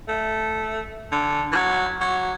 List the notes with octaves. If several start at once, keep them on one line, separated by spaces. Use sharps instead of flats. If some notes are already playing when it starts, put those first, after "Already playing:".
A3
D3
E3
F#3
F#3